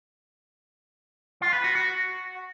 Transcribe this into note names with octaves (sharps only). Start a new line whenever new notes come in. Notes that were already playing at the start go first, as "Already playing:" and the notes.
F4
B4
F#4
F#4